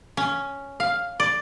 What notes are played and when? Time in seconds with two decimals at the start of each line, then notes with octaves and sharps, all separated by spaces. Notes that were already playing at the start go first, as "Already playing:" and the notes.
0.17 C#4
0.80 F5
1.20 D5